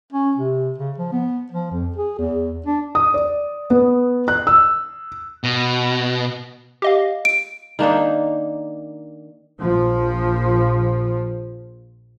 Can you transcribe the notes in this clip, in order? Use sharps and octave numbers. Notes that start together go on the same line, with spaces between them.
C#4
C3
C#3
F3
B3
F3
F2
G#4
E2
D4
D#6
D5
B3
F#6
E6
B2
G4 D#5 F5
D7
D#3 A#3 D4 D#4
A#1 F3